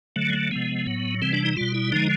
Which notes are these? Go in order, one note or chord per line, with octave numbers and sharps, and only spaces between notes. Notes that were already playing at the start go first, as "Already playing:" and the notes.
D3 F#3 A3
G#3
A3
C3 F3 G#3 B3
A2 F#3
C3 E3 G3 C4
D4
D#4
B2 G3 F4
E4
D3 F3 G#3 D#4